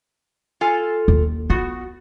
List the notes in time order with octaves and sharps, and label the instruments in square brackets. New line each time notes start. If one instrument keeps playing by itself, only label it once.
[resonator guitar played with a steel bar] F4 A4 G#5
[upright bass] D#2
[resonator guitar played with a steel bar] B3 F#4 [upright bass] F4